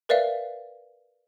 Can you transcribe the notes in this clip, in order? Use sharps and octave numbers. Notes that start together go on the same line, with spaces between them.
A#4 B4 D5 E5 F5